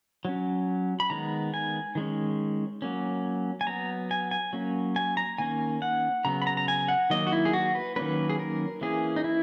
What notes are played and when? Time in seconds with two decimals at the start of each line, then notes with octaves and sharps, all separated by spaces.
0.25 F#3 C#4
1.00 B5
1.10 D#3 G#3 B3 A#5
1.54 G#5
1.95 D#3 G#3 C#4
2.82 F#3 A#3 C#4
3.61 G#5
3.67 F#3 B3 A#5
4.11 G#5
4.31 G#5
4.53 F#3 A#3 C#4
4.96 G#5
5.17 A#5
5.38 D#3 A#3 C#4 G#5
5.82 F#5
6.25 C#3 F#3 B3 A#5
6.42 B5
6.47 A#5
6.57 A#5
6.68 G#5
6.88 F#5
7.10 D#3 F#3 A#3 D#5
7.27 F#4
7.32 E4
7.45 G#4
7.53 F#4
7.75 B4
7.96 D#3 F#3 A#3 C#4 B4
8.29 G#4
8.39 A#4
8.81 E3 A#3 C#4 G#4
9.16 D#4
9.24 E4